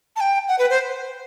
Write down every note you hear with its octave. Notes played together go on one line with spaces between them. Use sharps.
A5
G5
F#5
B4
C5